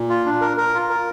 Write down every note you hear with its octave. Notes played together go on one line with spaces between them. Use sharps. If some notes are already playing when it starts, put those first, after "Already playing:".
Already playing: A#2
F4
D4
A#4
A#4
F4
A#4